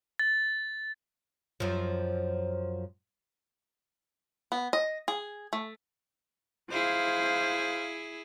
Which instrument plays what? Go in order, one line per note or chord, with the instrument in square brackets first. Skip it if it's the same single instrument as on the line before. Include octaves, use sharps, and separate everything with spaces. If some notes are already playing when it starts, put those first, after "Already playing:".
[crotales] A6
[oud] F#2 F3
[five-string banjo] B3
D#5
G#4
A3
[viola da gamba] E4 G#4 [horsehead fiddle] C5 F5